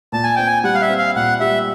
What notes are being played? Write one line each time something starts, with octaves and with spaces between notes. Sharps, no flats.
A#2 A5
G#5
C4 G5
G#5
G3 F#5
F5
E5
C4
F5
A#2 F#5
G3 E5